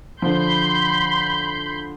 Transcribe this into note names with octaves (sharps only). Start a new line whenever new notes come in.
D3 F3 B5 C6 G6